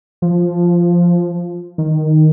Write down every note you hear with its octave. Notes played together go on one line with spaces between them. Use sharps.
F3
D#3